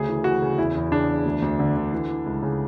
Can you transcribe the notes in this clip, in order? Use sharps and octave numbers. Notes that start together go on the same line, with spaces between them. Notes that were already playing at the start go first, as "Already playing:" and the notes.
Already playing: D2 C#3 G#4
E3
E3 F#4
C#3
E2 E4
E2
C#3 D4
E2
D2
D2
D3
D3
E3
E3
C#2
C#3